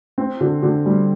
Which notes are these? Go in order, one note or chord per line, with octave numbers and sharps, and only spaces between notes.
C4
D3
D3
G3